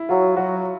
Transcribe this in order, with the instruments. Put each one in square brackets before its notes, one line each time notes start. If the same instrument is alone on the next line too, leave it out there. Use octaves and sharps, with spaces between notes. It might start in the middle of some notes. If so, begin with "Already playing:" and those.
Already playing: [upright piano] E4
[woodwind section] F#3 [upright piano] F4
[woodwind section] F#3 [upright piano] F#4